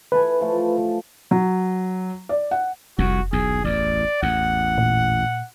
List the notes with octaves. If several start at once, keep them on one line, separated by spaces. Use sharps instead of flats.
E3 A4 B4 G#5
F3 A3
F#3
D5
F#5
F1 C2 F2 F#4
B1 E2 G#4
A1 E2 D5
A1 E2 F#5
A#2